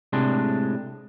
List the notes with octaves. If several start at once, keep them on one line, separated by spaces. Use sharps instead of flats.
A2 C3 G#3 D4